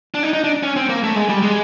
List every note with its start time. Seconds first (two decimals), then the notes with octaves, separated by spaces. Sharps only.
0.14 D4
0.23 D#4
0.33 D#4
0.44 D4
0.63 C#4
0.76 C4
0.89 A#3
1.04 A3
1.16 G#3
1.29 G3
1.43 G#3